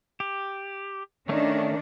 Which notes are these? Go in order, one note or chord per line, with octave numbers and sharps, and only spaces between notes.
G4
D#3 A3 C#4 D4